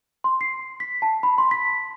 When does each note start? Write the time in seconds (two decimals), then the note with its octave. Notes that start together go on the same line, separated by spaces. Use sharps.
0.24 C6
0.41 C7
0.80 B6
1.02 A5
1.23 B5
1.38 C6
1.51 B6